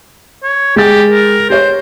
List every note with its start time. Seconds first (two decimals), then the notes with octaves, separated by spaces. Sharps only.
0.43 C#5
0.76 G#3 G4 A6
1.10 A#4
1.50 G4 C5 C#5